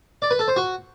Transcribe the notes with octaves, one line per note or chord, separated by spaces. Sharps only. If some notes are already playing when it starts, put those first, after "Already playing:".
D5
B4
A4
C5
F#4